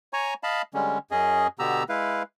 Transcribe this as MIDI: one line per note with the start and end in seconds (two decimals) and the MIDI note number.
0.13 0.34 73
0.13 0.34 80
0.13 0.34 82
0.13 0.34 85
0.43 0.62 75
0.43 0.62 77
0.43 0.62 81
0.43 0.62 83
0.74 0.98 50
0.74 0.98 55
0.74 0.98 56
0.74 0.98 61
1.11 1.47 42
1.11 1.47 61
1.11 1.47 68
1.11 1.47 75
1.59 1.83 47
1.59 1.83 50
1.59 1.83 59
1.59 1.83 67
1.59 1.83 82
1.59 1.83 88
1.89 2.23 56
1.89 2.23 64
1.89 2.23 71
1.89 2.23 77